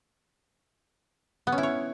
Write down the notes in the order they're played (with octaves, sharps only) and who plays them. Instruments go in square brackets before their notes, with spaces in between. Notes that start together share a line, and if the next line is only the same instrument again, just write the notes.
[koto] B3
C#4
E4
C#5